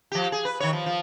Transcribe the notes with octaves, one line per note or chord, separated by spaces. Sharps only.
F3 G4
G#4
B4
D#3 C#5
F3
F3